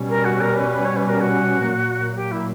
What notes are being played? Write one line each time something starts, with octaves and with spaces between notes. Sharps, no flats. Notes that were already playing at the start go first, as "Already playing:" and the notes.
Already playing: B2 G3 C#4
A#4
F#4
A#4
B4
B4
C#5
B4
A#4
F#4
A#2 F#3 A#3
G4
E4